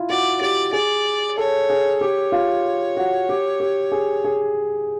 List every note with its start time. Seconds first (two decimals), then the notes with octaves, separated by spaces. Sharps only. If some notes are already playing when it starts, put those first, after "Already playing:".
Already playing: E4 F4
0.10 F#4 D5
0.41 G4 D5
0.73 G#4 D5
1.37 A4 C#5
1.70 G#4
2.01 G4 C#5
2.32 F4
2.97 F#4
3.29 G4
3.60 G4
3.92 G#4
4.24 G#4